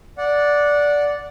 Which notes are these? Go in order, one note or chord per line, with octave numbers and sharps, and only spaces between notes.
D5 F#5